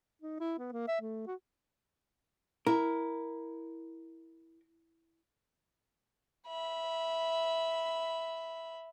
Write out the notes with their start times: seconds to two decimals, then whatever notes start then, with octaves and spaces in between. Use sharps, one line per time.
0.22 D#4
0.40 E4
0.59 B3
0.72 A#3
0.88 E5
1.01 A3
1.27 F#4
2.67 E4 A#4
6.47 E5 B5